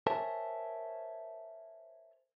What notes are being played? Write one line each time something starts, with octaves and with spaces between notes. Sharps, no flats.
A#4 C5 C#5 E5 G#5 A5